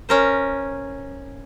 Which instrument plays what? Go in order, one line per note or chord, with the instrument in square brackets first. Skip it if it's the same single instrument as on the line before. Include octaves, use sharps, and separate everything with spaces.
[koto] C#4 A#4 C5